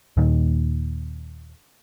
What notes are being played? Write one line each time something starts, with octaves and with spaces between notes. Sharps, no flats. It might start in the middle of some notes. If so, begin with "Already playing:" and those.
D#1 D#2 A#2 D#3